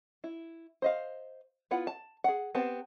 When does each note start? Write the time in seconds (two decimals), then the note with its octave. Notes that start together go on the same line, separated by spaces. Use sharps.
0.24 E4
0.82 C5 D#5 F5
1.71 B3 E4 F4 F#5
1.87 A5
2.24 G#4 F#5
2.55 B3 C4 G4 C5 A5